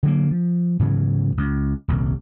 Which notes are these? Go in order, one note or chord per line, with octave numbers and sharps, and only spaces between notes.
D3 F#3 A#3
F3
G#2 C#3 E3 F#3
C#2
D#1 C2 C3 G3